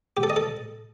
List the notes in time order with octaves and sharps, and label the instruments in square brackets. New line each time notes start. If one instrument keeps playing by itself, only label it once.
[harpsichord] G4
A4
D#5
A4